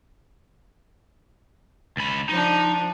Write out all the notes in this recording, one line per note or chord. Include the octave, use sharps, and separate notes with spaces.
C#2 B5
F3 D4 D#4